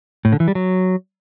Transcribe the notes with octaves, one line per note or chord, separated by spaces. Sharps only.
A2
D3
E3
G3
F#3